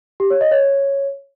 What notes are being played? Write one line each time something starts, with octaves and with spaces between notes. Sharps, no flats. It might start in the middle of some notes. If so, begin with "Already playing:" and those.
G4
C#5
D#5
C#5